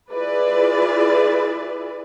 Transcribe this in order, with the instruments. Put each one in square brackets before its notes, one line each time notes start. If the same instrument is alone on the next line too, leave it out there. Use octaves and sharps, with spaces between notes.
[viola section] E4 F4 G#4 B4 D5